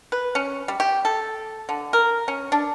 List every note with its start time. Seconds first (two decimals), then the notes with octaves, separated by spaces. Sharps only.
0.12 B4
0.35 C#4
0.68 G3
0.80 G4
1.05 A4
1.69 D3
1.93 A#4
2.28 C#4
2.52 D4